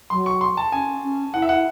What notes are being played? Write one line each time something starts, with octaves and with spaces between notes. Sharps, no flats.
F#3 C6
C#6
C6
A5
C#4 G#5
C#4
E4 F#5
E5
E4 F#5